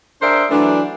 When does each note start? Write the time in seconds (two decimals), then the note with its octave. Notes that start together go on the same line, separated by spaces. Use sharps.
0.21 D4 G#4 A#4 C5 D5 E5
0.50 E3 F#3 A3 D4